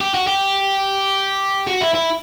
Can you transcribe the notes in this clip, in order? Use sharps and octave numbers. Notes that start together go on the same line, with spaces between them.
G4
F#4
G4
F#4
E4
E4